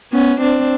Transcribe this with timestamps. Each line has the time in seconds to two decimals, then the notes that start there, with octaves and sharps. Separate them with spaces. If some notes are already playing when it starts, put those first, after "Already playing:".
0.12 B3 C#4
0.40 C4 D4